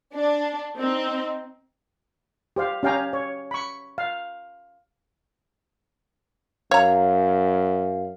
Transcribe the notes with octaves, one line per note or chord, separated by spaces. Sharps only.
D4
C4 D#4
G4 C5 F5
C#4 G4 F5 G5 G#5 A#5
C#5
B5 C#6
F5
F#2 C#5 F5 A#5